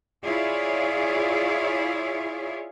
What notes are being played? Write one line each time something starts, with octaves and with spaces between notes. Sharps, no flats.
E4 F4 G#4 C#5 D5